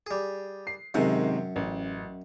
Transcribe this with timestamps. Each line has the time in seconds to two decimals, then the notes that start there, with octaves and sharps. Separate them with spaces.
0.07 G3 G#4
0.67 C7
0.94 F#2 C3 D#3 G#3 F#5
1.56 A1